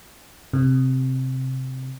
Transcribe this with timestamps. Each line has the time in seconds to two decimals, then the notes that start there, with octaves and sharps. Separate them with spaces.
0.53 C3